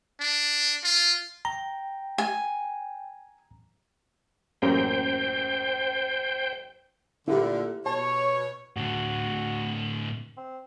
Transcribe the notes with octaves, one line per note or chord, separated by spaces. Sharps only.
D4
F4
G5 A#5
G#5
A1 F#2 A#3 C5 G5
A#2 D3 E4 G4
B2 C#5 A5
A2 D3 F#4
C4